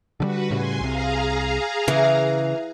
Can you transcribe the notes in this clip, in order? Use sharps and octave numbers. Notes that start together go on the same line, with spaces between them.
D3 F3 G3 F#4 B4
A2 C#3 G3 G#5 C6
C2 C3 G#4 F5 A#5
C#3 E3